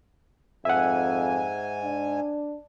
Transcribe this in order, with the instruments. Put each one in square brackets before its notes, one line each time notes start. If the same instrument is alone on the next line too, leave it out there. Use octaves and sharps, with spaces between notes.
[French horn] F2 [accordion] G#2 G#5 [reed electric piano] E5 F#5
[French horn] D4